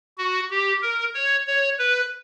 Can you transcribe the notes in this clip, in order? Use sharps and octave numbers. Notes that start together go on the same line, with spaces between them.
F#4
G4
A#4
C#5
C#5
B4